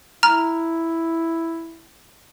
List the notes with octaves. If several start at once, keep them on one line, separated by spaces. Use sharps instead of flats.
E4 A#5 F6